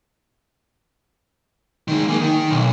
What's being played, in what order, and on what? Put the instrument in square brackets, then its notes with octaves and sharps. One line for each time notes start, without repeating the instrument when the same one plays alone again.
[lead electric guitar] D#3 G#3
A#3 G#4
D#3
B1